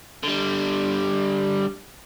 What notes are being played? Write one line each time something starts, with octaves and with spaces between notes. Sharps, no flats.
D3 G3